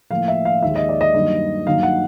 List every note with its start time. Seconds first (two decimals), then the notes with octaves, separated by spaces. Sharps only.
0.10 A2 F3 A#3 F5
0.28 E5
0.45 F5
0.63 D#2 D#3 G#3 E5
0.75 D#5
0.89 D5
1.01 D#5
1.14 G2 D#3 F#3 A#3
1.67 G2 D#3 F#3 A#3 F5
1.83 F#5